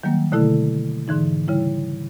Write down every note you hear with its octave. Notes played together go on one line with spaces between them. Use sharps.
D#3 F#3 G3 A#3
B2 D3 A3 E4 A4
G#2 D3 E3 D#4
C#3 G3 E4